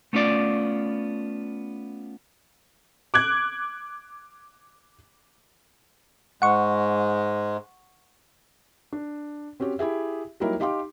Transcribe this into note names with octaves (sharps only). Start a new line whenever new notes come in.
A3 B3 C#4 F4 D5
D6 F#6 G#6
G#2 G#3 F#5 C#6
D4
C4 C#4 F#4 G4
E4 G4 G#4 E5
F#3 G3 A#3 D#4 E4 A#4
D#4 G4 F5 C6 D6